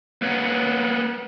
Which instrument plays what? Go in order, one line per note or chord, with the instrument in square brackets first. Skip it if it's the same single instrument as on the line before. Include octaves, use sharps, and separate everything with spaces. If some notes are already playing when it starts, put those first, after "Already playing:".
[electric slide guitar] A#3 B4 C#5 F#5